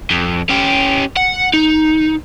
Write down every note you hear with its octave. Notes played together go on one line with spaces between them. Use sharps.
F2
C#4 G4
F#5
D#4